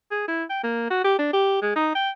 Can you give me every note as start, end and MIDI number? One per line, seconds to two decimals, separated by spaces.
0.11 0.26 68
0.28 0.45 64
0.50 0.63 79
0.64 0.89 58
0.90 1.01 66
1.04 1.15 67
1.19 1.31 62
1.33 1.61 67
1.62 1.73 56
1.76 1.91 63
1.95 2.10 79